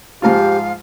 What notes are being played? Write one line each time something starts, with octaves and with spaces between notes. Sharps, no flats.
G#2 F3 F4 G4 F5